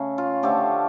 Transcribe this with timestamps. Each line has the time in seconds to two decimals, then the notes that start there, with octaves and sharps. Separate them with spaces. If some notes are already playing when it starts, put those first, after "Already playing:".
Already playing: C#3 A3 C#4
0.18 F4
0.43 D3 F3 A3 G4